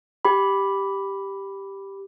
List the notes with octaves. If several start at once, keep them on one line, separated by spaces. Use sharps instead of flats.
G4 B5